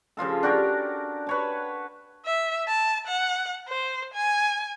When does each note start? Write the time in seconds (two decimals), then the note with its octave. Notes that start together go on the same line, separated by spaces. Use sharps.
0.17 C#3 F3 F4 A4
0.43 D4 F#4 G4 A#4
1.27 B4 C#5 A5
2.26 E5
2.68 A5
3.07 F#5
3.68 C5
4.14 G#5